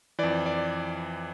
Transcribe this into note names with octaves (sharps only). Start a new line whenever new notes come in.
F2 E3 D5
D5